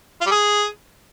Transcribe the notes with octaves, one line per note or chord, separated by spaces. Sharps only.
F4
G3
G#4